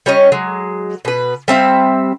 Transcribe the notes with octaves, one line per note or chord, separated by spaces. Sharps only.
G3 C#4 C#5 D#5
F#3 G#3
B2 B4
G3 C4 E5 F5